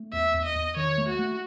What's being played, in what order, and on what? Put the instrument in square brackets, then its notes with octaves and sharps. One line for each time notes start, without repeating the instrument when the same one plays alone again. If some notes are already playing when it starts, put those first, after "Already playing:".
Already playing: [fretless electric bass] A3
[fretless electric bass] E2 [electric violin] E5
[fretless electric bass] E2
[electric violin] D#5
[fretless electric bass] E2
[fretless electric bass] D#3 [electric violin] C#5
[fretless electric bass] A3
[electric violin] F#4
[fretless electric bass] A3